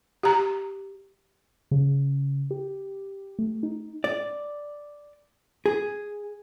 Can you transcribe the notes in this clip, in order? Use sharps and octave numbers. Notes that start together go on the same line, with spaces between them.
G4 A#5
C#3
G4
A3
D#4
D5
G#4